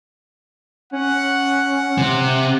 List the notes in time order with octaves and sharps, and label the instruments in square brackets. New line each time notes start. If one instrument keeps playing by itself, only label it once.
[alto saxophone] C#4 [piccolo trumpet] F#5
[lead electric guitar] C3